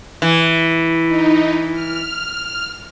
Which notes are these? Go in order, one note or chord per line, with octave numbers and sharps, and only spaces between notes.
E3 E4
D#4
F6